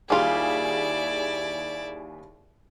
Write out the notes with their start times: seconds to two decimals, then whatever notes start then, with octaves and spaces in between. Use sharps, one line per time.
0.10 D#2 G3 E4 F4 G4 G#4 D5